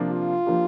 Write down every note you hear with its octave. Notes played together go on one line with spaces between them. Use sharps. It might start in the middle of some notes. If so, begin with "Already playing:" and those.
Already playing: C3 F3 A#3 D4
F4
F3 A#3 D4 G4